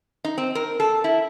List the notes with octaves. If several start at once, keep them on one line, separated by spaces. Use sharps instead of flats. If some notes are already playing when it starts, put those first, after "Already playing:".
D#4
C4
A#4
A4
E4